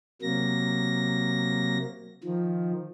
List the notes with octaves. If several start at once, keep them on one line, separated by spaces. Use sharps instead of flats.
C3 F#3 A#3 A#6
D#3 F3